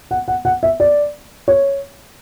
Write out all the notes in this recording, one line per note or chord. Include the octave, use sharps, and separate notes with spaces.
F#5
F#5
F#5
E5
D5
C#5